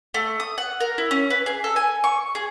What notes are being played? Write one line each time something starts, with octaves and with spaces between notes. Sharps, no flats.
A3
D#6
F#5
A#4
E4
C#4
B4
G#4
A4
G#5
C#6
G#4